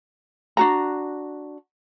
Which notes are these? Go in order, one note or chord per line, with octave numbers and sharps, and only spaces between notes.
D4 F#4 A#5